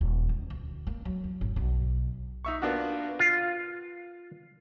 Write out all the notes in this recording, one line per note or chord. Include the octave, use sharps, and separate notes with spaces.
D#1
E3
D2
A#3
F#3
E2
G#1
B1
D#4 E5 C#6
A#3 B3 D4 F4 F#4
F4